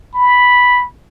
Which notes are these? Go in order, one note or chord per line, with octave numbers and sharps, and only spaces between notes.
B5